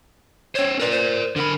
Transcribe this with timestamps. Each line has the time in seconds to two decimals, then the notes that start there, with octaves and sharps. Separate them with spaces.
0.55 C#4 C5 C#5
0.79 A#4 B4 D5
0.91 C5
1.36 D3 A#4 B5